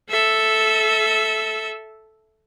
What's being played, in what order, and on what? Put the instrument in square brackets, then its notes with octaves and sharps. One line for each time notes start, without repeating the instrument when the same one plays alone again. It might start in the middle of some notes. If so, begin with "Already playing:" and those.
[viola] A4 E5